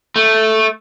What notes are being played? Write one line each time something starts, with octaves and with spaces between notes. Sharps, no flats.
A3